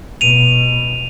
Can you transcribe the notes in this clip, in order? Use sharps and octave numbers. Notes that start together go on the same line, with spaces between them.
B2 D#7 F7